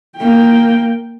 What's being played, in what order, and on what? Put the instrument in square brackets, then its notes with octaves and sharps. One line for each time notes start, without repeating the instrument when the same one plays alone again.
[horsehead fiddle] A#3 G5